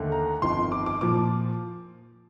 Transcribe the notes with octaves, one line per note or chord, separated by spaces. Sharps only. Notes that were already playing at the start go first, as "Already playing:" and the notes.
Already playing: D#2 D3 A3
A#5
G1 F2 D#3 C6
D6
D6
A#2 F3 D6